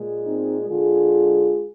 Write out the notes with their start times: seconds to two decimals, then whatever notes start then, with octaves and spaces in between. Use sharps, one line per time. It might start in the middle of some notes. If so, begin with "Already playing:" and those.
Already playing: A#2 G#3
0.27 C4 D#4
0.70 D3 G#3 F4 G#4